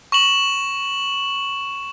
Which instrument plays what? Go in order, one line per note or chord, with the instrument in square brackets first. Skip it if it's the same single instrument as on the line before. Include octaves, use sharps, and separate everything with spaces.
[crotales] C#6 E7 F#7